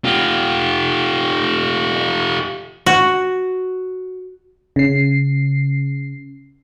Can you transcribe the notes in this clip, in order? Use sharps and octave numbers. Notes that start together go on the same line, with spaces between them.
F4 G4
F#4
C#3 C7